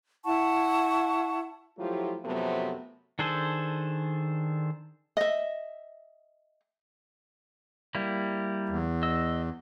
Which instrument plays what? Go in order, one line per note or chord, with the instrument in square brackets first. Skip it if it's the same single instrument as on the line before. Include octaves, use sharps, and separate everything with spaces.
[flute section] E4 F#5 A5 C#6
[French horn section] F3 F#3 A3 E4 F4 G4
F#2 C3 F3 F#3 A3 B3
[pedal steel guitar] D#3 D4 G#4 A4 C5
[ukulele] D#5 E5
[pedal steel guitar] G3 A#3 E4
[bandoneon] E2
[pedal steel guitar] D#5 E6